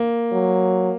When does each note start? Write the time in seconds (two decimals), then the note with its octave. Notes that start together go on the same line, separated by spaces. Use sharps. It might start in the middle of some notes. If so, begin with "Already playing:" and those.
Already playing: A#3
0.32 F#3